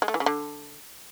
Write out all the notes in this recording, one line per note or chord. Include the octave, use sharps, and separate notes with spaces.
G#3
A3
E3
C#3
D3